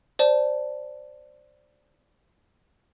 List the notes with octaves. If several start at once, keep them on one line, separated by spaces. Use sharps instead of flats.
C5 D5 A5